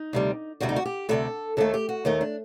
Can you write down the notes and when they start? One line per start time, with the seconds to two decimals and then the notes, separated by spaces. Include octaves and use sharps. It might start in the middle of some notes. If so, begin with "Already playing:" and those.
Already playing: D#4
0.13 D2 C3 G3
0.60 D2 C3 G3 F#4
0.69 D#4
0.76 F#4
0.85 G4
1.09 D2 C3 G3 A4
1.57 D#2 D#3 A3 A4
1.74 G4
1.89 F#4
2.05 D#2 D#3 A3 D#4
2.21 D4